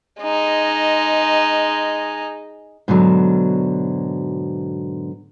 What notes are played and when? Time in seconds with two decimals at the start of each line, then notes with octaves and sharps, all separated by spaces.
0.21 G#3 D#4
2.88 G#2 B2 D3 F#3